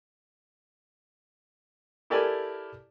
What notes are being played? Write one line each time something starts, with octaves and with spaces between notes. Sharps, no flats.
E4 G4 A4 A#4 D5 G#5